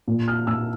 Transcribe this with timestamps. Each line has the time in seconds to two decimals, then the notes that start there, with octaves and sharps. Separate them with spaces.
0.08 A#2
0.28 F6
0.47 A#2 E6